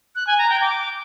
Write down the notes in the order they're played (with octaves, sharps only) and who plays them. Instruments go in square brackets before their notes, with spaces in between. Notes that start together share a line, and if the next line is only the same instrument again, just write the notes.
[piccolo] F#6
G#5
A#5
G5
D6